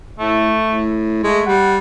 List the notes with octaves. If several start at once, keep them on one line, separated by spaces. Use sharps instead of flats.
A2 A3
A2
G#3 A3
G3 F#5